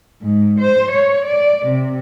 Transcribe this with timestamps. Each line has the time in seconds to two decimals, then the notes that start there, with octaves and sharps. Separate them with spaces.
0.22 G#2
0.59 C5
0.91 C#5
1.25 D5
1.66 C3